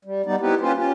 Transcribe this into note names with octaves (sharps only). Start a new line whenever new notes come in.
G3
G3 B3 D#4 D5
B3 C4 D#4 E4 G4 B4
A#3 C#4 F4 G4 B4 C5
C#4 F4 G4